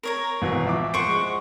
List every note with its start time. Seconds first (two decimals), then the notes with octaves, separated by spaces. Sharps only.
0.03 A#4 C#5 A#5
0.42 G#1 B2 E3
0.66 F3 E5 D6
0.94 C5 F#5 C#6 D7
1.07 G#3